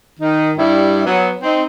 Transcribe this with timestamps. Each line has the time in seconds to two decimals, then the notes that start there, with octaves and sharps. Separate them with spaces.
0.20 D#3 D#4
0.58 G2 G3 E4
1.06 F#3 B3
1.42 C4 D#4